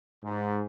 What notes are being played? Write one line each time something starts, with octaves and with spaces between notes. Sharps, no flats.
G#2